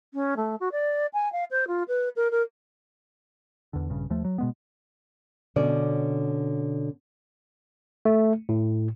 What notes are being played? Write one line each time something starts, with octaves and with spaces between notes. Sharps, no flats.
C#4
A3
F#4
D5
G#5
F5
C5
F4
B4
A#4
A#4
E2 D3
A#1 G2 C#3
D#2 F3 A3
F#3
B2 G#3 B3
B2 D3 C#4 D5
A3
A2